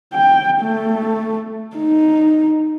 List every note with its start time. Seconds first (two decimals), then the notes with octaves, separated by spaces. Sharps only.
0.14 G5
0.61 A3
1.77 D#4